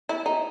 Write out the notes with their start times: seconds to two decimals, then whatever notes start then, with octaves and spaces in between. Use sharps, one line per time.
0.09 E4
0.26 D#4